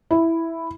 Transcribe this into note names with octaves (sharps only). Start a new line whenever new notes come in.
E4